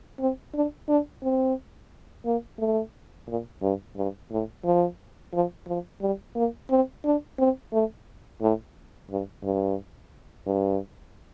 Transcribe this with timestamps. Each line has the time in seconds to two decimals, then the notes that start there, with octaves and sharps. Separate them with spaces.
0.20 C4
0.54 D4
0.89 D4
1.23 C4
2.25 A#3
2.59 A3
3.28 A#2
3.62 G2
3.97 G2
4.31 A2
4.65 F3
5.33 F3
5.67 F3
6.01 G3
6.36 A#3
6.70 C4
7.05 D4
7.39 C4
7.73 A3
8.41 A2
9.10 G2
9.44 G2
10.47 G2